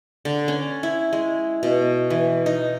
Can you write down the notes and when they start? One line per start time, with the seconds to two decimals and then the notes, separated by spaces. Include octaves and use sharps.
0.25 D3
0.48 C#4
0.83 E4
1.13 G#3
1.63 B2
2.10 E3
2.46 D#4